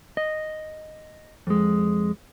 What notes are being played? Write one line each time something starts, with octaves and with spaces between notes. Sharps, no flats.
D#5
F2 G#3